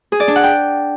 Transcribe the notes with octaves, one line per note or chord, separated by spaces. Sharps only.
G#4
D5
D4
F#5
G5